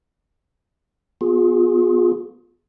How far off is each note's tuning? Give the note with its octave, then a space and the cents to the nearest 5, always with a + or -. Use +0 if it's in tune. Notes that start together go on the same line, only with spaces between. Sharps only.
B3 +0 F4 +40 G#4 +0